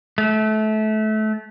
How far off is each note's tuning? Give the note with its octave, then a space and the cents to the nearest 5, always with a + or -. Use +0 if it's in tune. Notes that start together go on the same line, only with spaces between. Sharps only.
A3 -25